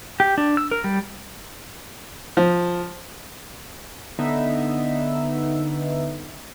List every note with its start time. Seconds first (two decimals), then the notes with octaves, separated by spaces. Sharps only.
0.20 G4
0.38 D4
0.57 E6
0.71 A#4
0.84 G3
2.37 F3
4.19 D3 B3 D#4 E5